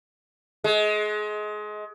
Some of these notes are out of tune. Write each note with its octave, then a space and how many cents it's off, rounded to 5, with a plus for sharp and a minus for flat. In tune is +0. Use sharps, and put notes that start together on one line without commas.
G#3 +25